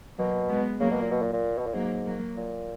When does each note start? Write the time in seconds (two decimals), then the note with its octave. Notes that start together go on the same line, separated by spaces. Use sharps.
0.18 B2 F#3 A#3
0.49 G#3 B3
0.80 C#3 F#3 A#3
0.91 B2
1.01 A#2
1.11 B2
1.22 A#2
1.33 A#2
1.58 B2
1.66 A#2
1.74 G#2 F#3 A#3
2.05 F#3 A#3
2.36 A#2